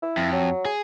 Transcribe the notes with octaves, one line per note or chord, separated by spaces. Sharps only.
E4
F2
F#3
G#4